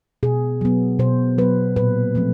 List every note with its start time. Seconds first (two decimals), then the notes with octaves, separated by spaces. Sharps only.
0.23 B2 G#4
0.61 F#3 B3
0.99 B2 C5
1.38 F#3 B3 B4
1.76 A#2 B4
2.15 F3 A3 C4